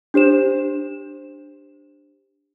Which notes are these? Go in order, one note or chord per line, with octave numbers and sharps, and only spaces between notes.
D4 G4 C5 E7